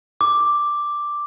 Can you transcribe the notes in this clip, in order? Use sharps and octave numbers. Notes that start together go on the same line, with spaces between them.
D6